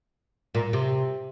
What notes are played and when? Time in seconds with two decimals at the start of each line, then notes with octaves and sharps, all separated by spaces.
0.55 A#2
0.73 C3